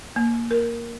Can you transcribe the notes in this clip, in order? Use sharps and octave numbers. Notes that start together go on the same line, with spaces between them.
A#3
A#4